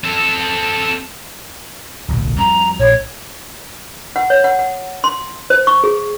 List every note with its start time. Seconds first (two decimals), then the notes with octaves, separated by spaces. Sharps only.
0.04 C4 A4
2.08 D1 B1 A#2
2.38 F2 G3 A#5
2.79 A#1 C#5
4.16 F#5
4.30 C#5
4.44 F#5
4.59 F#5
5.04 C6
5.50 C5
5.67 C#6
5.84 G#4